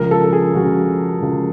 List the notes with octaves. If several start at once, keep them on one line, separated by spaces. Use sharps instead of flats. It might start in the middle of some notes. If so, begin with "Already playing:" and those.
Already playing: C#2 C#3 F3 A#4
A4
A4
G#4
C#2 C#3 F3 F#4
C#2 C#3 F3